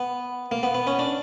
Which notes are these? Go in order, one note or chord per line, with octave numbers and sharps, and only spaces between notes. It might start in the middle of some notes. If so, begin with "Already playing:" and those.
Already playing: B3
A#3
B3
B3
C#4
D4